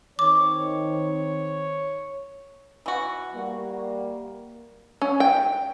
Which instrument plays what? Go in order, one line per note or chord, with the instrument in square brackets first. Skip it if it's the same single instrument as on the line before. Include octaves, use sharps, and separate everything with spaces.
[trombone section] D#3 C4 [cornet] C#5 [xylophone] D6
[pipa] E3 F#4
[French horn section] G3 A#3
[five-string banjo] C#4
G5